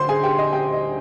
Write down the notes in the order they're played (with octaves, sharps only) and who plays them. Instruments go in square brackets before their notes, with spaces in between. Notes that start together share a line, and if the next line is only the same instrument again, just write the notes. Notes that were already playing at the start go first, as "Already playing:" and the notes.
Already playing: [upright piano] D2 C5 C6
G#4 G#5
G4 G5
D#5
G4 G5
D#5